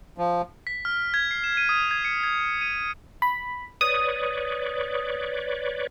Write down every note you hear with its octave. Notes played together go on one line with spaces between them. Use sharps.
F3
B6
F6
G#6
C7
E7
D#7
D#6
G#6
C#7
G#6
D#7
B5
B4 C#5 D5 D#6